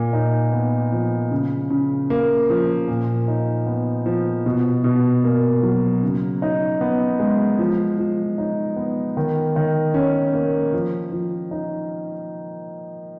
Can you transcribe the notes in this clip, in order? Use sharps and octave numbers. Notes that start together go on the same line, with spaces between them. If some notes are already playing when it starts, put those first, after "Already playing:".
Already playing: A#2
D#4
B3
F3
C#3
C#3
A#3
F3
A#2
D#4
B3
F3
B2
B2
A#3
F#3
C#3
D#4
B3
G#3
F3
F3
D#4
B3
D#3
D#3
C#4
A#3
F3
F3
D#4